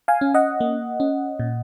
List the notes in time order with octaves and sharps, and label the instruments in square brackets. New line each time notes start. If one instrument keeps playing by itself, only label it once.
[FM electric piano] F5 G#5
C#4
D#5 F#5
A#3
C#4
A#2